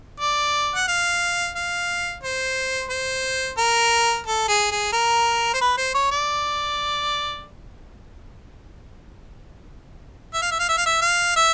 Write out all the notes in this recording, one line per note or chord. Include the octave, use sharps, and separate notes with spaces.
D5
F#5
F5
F5
C5
C5
A#4
A4
G#4
G#4
A#4
C5
B4
C5
C#5
D5
E5
F5
E5
F5
E5
F5
E5
F5
E5